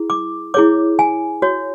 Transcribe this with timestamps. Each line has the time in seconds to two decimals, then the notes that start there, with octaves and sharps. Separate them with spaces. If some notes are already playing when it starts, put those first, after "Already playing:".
Already playing: E4 G#4
0.10 D6
0.54 E4 G#4 C#5 D6
0.99 G#5
1.42 F#4 C#5